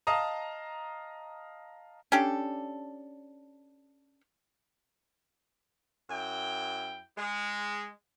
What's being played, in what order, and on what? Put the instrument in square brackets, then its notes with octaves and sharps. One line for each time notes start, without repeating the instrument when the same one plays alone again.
[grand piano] D#5 F5 A5 A#5 D#6
[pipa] C#4 D4 G4 A4
[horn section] F#2 E4 G5
G#3